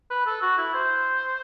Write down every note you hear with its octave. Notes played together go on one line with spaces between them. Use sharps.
B4
A4
F#4
E4
C5